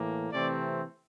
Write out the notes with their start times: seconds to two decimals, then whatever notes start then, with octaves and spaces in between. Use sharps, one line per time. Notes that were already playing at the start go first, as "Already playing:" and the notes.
Already playing: A2 E3 A#3
0.32 C3 E3 A3 C4 D5